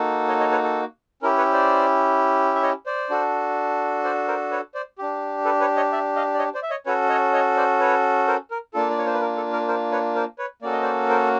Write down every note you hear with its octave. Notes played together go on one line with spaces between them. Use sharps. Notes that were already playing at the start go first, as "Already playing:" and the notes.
Already playing: A#3 D#4 F#4 A4
C#5 D#5
C#5 D#5
B4 C#5
A4
C#4 E4 G4 A#4
B4 C#5
C5 D5
E5
C#5 D#5
C5 D5
D4 F#4 A4
C5 D5
A#4 C5
B4 C#5
C5 D5
D4 G4
A4 B4
B4 C#5
C#5 D#5
D5 E5
D#5 F5
D5
C#5 D#5
C5 D5
E5
C#5 D#5
C#4 F#4 A4 B4 C#5
C#5 D#5
C#5 D#5
C5 D5
B4 C#5
A#4 C5
A#4
A#3 D4 F4 A4
D5
C#5
C5
B4
A#4
A4
A#4
A#4 C5
B4 C#5
A#4 C5
B4 C#5
A#3 C#4 F#4 A4 D5
D#5
C5 D5
A#4 C5